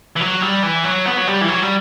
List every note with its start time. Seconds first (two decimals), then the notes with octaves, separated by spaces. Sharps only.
0.16 E3
0.20 F#3
0.42 G3
0.63 E3
0.84 F#3
1.06 B3
1.17 F#3
1.27 G3
1.41 E3
1.48 F#3
1.62 G3